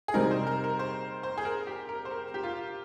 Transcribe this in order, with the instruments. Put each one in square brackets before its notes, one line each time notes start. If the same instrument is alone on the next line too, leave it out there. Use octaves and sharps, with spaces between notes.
[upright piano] G#4
[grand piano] C3 G3 C4 D#4 [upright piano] A#4
[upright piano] C5
A#4
A#4
C5
C5
G#4
A#4
G4
A#4
C5
A#4
G4
F4